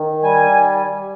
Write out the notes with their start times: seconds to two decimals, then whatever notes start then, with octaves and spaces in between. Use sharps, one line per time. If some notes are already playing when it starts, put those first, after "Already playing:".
Already playing: D#3
0.23 G3 G#5